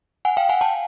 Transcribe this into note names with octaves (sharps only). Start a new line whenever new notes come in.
F#5 G#5
F5 G5
F#5 G#5
G5 A5